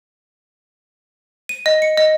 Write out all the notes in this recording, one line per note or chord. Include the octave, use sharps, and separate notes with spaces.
D#7
D#5
C#7
D#5